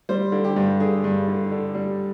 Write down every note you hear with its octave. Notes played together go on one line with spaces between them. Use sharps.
G3 C5
D3
G4
G2
D3 G#4
G2
D3
D3
G3